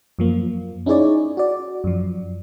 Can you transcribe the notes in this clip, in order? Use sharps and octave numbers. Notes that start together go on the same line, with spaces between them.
F#2 F3 A#3
C#4 D#4 E4 G#4 C#5 D5
F#4 D5
F#2 F3